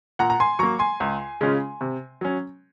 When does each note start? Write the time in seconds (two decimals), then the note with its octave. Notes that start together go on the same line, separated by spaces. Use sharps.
0.19 A#2 F#5 A#5
0.30 A#5
0.40 G#5 C6
0.59 F#3 A#3 A#5 C#6
0.79 G#5 C6
1.00 C#2
1.41 C#3 G#3 C#4 F4
1.81 C3
2.21 F#3 C#4